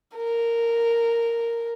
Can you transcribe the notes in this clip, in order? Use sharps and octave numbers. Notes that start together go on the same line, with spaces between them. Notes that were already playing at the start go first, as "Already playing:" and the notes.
A#4